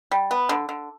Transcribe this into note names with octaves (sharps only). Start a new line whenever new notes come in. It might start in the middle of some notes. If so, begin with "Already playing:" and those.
G3
B3
D3
D3